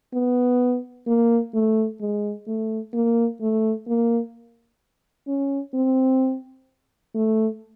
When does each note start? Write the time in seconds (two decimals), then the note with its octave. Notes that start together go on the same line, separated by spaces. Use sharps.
0.14 B3
1.07 A#3
1.54 A3
2.01 G#3
2.47 A3
2.93 A#3
3.41 A3
3.87 A#3
5.27 C#4
5.74 C4
7.15 A3